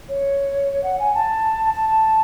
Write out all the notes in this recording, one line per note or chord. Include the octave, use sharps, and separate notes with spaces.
C#5
F#5
G#5
A5
A5